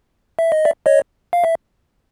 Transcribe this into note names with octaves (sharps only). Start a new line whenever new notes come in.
E5
D#5
D5 E5
C#5 D#5
F5
E5